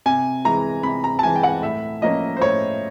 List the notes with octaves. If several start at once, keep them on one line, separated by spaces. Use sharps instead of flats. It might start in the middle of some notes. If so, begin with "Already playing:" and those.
C3 G#5
E3 G#3 A#5
C3 B5
A#5
A5
E3 G#3 G#5
G5
F#5
A2 E5
F3 A#3 C#4 D#5
C5
A2 C#5